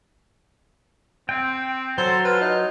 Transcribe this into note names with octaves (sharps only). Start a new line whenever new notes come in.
C4 G5
F#3 A4 C5
F4 B4
D#4